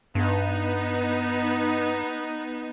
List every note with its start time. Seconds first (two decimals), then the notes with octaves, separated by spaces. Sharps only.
0.15 G2 B3 D#4